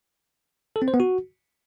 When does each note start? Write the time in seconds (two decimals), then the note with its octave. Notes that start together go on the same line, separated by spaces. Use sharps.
0.76 A4
0.82 C4
0.88 C5
0.94 B3
1.00 F#4